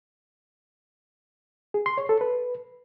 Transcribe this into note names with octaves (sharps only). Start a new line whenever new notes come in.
G#4
C6
C#5
A4
B4